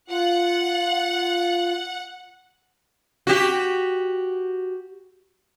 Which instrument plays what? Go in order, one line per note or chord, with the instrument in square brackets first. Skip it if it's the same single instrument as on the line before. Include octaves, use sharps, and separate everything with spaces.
[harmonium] F4 [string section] F#5
[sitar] F#4 G4